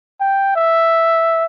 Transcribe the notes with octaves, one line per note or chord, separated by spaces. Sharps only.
G5
E5